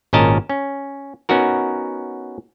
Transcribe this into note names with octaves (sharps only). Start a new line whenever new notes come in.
G#1 A#2 C#4 A#4 D#5 A5
C#4
B3 C#4 D#4 F#4 A#4